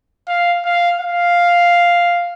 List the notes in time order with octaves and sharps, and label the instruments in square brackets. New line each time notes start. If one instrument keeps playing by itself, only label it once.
[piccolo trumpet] F5
F5
F5